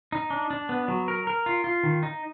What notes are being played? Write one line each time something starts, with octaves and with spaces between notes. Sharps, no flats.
D#4
D4
D4
B3
F#3
A#4
A#4
F4
F4
D#3
D#4